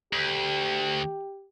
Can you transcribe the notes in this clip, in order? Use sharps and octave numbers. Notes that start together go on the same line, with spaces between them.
D2 G4